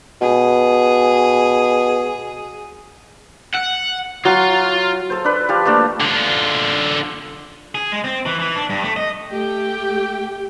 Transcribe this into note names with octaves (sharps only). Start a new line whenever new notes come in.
B2 G#4
F#5
F#3 F4
A4 C5
D4 B4
F3 G4 F5 A5
A3 A#3 D4 A4
D3 F4
G#4
G#3
C4
E3
E3
D4
G2
A3
D#5
A3 G4 G5